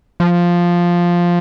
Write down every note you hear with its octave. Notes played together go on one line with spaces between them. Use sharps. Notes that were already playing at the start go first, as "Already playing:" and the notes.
F3